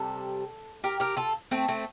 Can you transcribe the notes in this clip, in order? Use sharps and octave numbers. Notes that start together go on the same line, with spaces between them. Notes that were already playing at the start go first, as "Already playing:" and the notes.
Already playing: C3 G3 A4
G4 A#4
G4 A#4
F4 A4
A3 C4
A3 C4